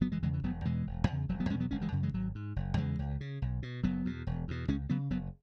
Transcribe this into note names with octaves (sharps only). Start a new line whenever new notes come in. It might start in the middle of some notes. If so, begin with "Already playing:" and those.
F#1 F#3 B3
E3 G#3
E2 C#3 E3 G#3
E3
E1 F#3 B3
E2 B2 E3 G#3
E1
E2 C#3
E1 F#3
F#3 B3
E2 B2 G#3 C#4
F#3 B3
F#1 G#3 C#4
E3 G#3
F#2 C#3
E3 G#3
G#1 F#3
G#2
F#1
E2 C#3 E3 G#3
C#2
C#3
B1
B2
F#1 F#3 B3
E2 B2
E1
E2 B2
C#2 G#3 C#4
C#3 F#3 B3
F#1 F#3 B3